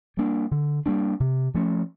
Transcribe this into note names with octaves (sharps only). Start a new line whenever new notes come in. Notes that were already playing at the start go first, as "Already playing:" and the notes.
G3 A#3 D4
D3
G3 A#3 D4
C3
F3 A3 C#4